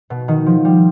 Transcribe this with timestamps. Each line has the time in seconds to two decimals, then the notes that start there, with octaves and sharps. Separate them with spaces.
0.10 B2
0.28 D#3
0.46 F3
0.65 G3